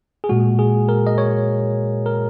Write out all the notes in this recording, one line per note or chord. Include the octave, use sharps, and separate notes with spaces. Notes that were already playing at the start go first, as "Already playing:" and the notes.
G#4
A#2 G#3 F#4
G#4
A#4
D#5
C#5
A#4